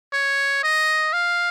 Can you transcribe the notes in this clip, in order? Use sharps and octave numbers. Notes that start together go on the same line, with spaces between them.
C#5
D#5
F5